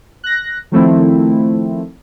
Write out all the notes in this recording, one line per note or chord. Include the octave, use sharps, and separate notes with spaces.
F#6 A#6
D#3 F3 A3 C4 E4